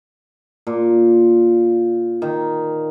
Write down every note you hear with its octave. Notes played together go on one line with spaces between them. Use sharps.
A#2
D#3